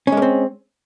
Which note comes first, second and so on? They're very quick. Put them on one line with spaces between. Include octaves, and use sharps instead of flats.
C#4 G#3 A#3 C4